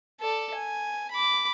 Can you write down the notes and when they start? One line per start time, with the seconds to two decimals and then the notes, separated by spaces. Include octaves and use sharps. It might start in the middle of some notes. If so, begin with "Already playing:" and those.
0.20 A4 D5
0.54 G#5
1.11 B5 D6